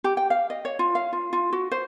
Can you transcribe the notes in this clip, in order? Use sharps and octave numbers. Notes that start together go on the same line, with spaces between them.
G4
G5
F5
D#5
C#5
F4
F5
F4
F4
F#4
C5